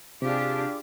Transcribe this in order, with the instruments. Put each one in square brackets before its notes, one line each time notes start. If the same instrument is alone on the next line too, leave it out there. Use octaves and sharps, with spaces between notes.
[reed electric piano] C3 [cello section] D4 G4 [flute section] F4 G#4 D6